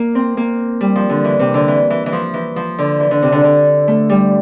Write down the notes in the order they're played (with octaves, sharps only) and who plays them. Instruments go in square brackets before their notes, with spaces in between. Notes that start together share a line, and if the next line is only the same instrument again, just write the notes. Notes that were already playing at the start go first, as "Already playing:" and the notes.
Already playing: [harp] A#3
C4
A#3
G3
F3
D3
E3
C3
D3
E3
E3
E3
F3
E3
F3
D3
E3
D3
C3
D3
D3
A3
G3